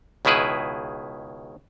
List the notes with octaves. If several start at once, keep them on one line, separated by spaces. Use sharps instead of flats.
C#2 B2 D#3 E4 G#4 B4